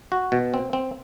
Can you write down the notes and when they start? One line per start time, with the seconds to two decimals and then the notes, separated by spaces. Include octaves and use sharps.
0.12 F#4
0.32 B2
0.54 C4
0.73 C4